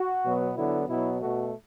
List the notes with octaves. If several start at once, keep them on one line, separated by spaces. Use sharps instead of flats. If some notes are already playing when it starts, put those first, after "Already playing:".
Already playing: F#4
B2 F#3 B3
D3 F#3 B3 E4
B2 F#3 B3 E4
B2 A3 F#4